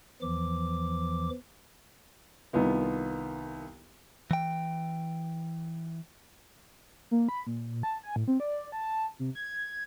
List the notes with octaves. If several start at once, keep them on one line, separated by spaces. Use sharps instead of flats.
E2 E3 F3 D6
C2 D#3 B3 F4
E3 G5
A#3
B5
A#2
A5
G#5
A2
C4
D5
A5
C3
G#6